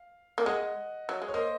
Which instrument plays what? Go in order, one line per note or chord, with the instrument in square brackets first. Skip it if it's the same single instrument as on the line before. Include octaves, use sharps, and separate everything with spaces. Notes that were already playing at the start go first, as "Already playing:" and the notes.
Already playing: [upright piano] F5
[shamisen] A#3
[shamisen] G#3 [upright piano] D#5 F#5
[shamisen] F#3
G#3
[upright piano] C#5
[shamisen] A#3 [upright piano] C5 D#5